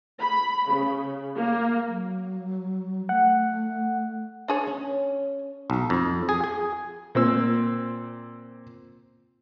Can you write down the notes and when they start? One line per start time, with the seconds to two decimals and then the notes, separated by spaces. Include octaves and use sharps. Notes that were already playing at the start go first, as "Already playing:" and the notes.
0.20 B5
0.71 C#3
1.36 A#3
1.87 F#3
3.09 A3 F#5
4.48 D4 G#4 C#5
4.67 C#4
5.70 B1
5.90 F2
6.29 G#4
6.44 G#4
7.15 A#2 C4 E6